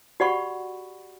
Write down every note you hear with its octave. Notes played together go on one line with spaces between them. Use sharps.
F#4 G4 D5 F#5 B5 C#6